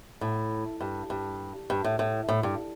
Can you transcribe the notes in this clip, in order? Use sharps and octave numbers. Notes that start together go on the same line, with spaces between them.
A2
G2
G2
G2
A2
A2
A2
G2